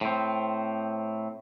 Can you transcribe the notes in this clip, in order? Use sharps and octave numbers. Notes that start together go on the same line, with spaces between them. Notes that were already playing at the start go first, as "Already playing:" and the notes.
A2 C4